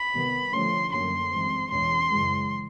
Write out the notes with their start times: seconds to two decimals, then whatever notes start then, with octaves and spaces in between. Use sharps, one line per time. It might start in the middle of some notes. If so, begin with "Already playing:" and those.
Already playing: B5
0.15 C3 D#3 G3 B3
0.53 D3 F3 A3 C#4 C6
0.92 F#2 D3 F#3 A#3 C#4 C6
1.31 G2 E3 G#3 C4
1.71 E2 B2 G#3 C#4 C6
2.09 F#2 C#3 E3 G#3